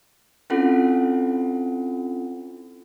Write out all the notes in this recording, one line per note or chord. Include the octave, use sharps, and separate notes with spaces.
C4 C#4 E4 F4 A4 F#5